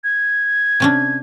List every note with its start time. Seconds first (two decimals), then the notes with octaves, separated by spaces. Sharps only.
0.04 G#6
0.80 C3 C#4 D4